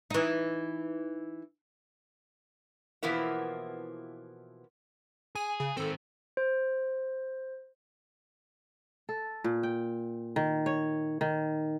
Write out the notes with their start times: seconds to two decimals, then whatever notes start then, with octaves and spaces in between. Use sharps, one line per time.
0.10 E3 D#4
3.03 B2 E3 F3 A#3 B3 E4
5.35 G#4 G#5
5.60 C#3
5.77 D#3 C4 A4
6.37 C5
9.09 A4
9.44 A#2
9.63 G5
10.36 D#3
10.66 C#5
11.21 D#3